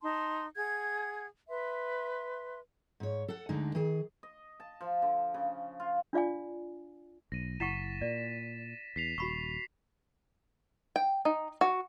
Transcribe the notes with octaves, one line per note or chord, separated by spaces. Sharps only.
D#4 A5 C6
G#4 F#5 G#6
B4 E5 C6
G#2 C#5
A4 F#5
D2 D3 G#3 D#4
D#3 G#4
D#5
A5
F3
D3
C#3
F4
D4 F4 D5 F5 G#5
B1 A#6 D#7
F#1 E4 F#5 C#6 A6 B6 E7
A#2 D5
E2 B6 C7 F7
D#1 F#4 B5 C#6
G5
D#4
F#4